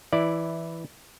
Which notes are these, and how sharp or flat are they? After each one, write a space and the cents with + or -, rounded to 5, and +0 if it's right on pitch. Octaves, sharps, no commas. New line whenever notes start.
E3 +0 E4 -5 D5 +0